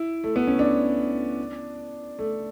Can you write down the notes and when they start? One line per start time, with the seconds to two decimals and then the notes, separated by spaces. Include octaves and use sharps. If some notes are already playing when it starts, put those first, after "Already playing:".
Already playing: E4
0.24 A3
0.36 B3
0.47 C#4
0.59 D4
2.19 A3